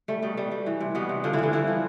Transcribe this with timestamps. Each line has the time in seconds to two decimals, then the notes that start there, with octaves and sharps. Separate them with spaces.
0.08 G3 A3
0.22 B2 G3
0.37 B2 G3
0.51 G3
0.66 E3
0.80 C3
0.95 B2 G3 B3
1.09 C3
1.24 D3 F3 D4
1.33 E3 E4
1.38 G2 D3 D4
1.52 G2 E3 E4
1.67 F3